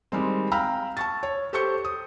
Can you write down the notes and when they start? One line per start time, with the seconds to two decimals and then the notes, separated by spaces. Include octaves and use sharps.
0.12 D#3 G3 G#3 C4
0.52 F5 G5 A#5 B5 E6 F6
0.97 A5 C#6 A6
1.23 C#5
1.53 G4 A4 C5 C#6 G6 C#7
1.85 D#6